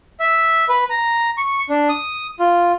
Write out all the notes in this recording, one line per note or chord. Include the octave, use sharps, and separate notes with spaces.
E5
B4
A#5
C#6
D4
D#6
F4